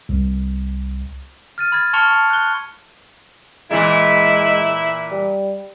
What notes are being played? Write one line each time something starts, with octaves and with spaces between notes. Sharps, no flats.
C2
F6 A6 D#7
B5 F6 G#6 A6
A5 C6 C#6 F6 C#7 F7
A5
F#6 G7
A#2 E3 G#3 E4
G3